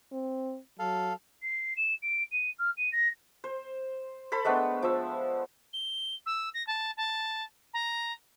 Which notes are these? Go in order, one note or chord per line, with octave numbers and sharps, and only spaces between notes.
C4
F#3 A4 F5
C7
E7
D7
D#7
F6
D#7
A#6
C5
A4 C5 B5
G#3 A3 B3 D4
F3 E6
G7
E6
A#6
A5
A5
A#5